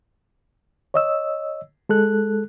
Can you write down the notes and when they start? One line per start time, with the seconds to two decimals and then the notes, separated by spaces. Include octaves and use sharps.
0.94 C#5 D#5 E6
1.89 G#3 A4 F#6